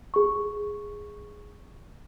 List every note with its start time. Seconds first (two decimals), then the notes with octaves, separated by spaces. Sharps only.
0.14 G#4 C#6